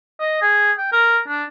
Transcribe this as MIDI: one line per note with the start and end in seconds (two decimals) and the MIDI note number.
0.20 0.39 75
0.41 0.72 68
0.78 0.90 79
0.93 1.19 70
1.28 1.44 62